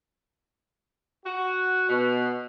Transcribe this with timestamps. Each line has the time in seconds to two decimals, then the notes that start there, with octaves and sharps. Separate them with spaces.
1.25 F#4
1.89 B2